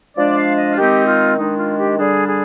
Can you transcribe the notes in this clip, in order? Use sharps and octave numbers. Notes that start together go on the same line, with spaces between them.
F3 G#3 D4 D5
F5
D#5
F4
D#3 G#3 C4 D#4 G4
F4
D#3 G#3 D4 D#4
F4
G4
D3 G3 D4 G#4
G#4